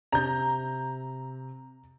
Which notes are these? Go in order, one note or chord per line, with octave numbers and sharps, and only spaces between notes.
C3 A#5 G6